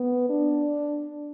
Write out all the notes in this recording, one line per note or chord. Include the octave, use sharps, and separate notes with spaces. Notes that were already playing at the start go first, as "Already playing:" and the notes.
Already playing: B3
D4